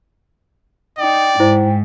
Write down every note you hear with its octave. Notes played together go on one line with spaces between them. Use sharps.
D#4 D5 G5
G#2 E4 C5